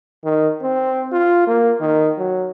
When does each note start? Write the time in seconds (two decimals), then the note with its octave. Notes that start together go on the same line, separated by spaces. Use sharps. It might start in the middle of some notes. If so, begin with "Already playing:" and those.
0.24 D#3
0.62 C4
1.12 F4
1.47 A#3
1.80 D#3
2.18 F#3